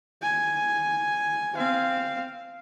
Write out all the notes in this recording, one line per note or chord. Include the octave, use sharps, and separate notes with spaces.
G#5
C4 F5